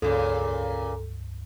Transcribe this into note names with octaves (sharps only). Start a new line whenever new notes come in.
C#2 G2 A#2 C#3 A4